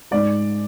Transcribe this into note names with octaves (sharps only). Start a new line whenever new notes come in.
G#2 G#3 D5